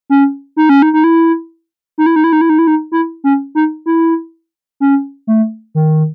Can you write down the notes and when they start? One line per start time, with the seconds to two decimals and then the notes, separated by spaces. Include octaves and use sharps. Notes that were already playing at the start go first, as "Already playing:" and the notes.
0.10 C#4
0.57 D#4
0.69 C#4
0.82 D#4
0.93 D#4
1.04 E4
1.98 D#4
2.06 E4
2.16 D#4
2.24 E4
2.33 D#4
2.41 E4
2.50 D#4
2.59 E4
2.67 D#4
2.92 E4
3.24 C#4
3.55 D#4
3.86 E4
4.80 C#4
5.27 A3
5.75 D#3